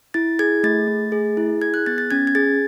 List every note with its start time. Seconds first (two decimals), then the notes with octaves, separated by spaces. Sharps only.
0.14 E4 A6
0.39 G#4 G#6
0.63 A3 A6
0.87 A3
1.12 G#4
1.37 E4
1.62 G#4 G#6
1.74 F#6
1.86 B3 A6
1.98 A6
2.11 C#4 G#6
2.27 G#6
2.35 G#4 A6